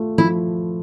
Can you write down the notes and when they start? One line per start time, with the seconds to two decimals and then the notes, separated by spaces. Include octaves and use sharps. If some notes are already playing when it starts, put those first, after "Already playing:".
Already playing: A3 F4
0.18 F3 E4